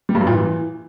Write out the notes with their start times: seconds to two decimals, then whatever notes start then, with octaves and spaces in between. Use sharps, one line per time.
0.09 G3
0.15 G2
0.21 F#2
0.27 A#2
0.33 E3